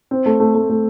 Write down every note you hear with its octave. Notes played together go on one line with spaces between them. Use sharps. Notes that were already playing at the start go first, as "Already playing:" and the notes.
C4
A3
A3
A3
A3